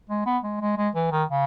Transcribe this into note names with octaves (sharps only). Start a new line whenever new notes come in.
G#3
B3
G#3
G#3
G#3
E3
D#3
C#3